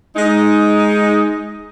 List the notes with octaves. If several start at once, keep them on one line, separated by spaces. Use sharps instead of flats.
G#3 D#4